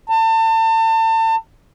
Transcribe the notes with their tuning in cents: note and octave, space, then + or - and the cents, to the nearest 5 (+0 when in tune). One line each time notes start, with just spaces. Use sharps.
A5 +35